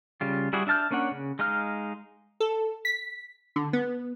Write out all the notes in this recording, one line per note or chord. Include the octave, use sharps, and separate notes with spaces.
C#3 G3 F4
G3 E4 F#4 G#4 C#6
D4 E5 A5 F6 G6
A#3 C#4 D4 C#5 F#5
C#3
G#3 D#4 F5 F6
A4
B6
D3
B3